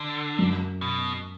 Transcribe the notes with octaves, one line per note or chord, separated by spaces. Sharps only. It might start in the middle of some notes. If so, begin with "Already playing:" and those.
Already playing: D3
F#2
B2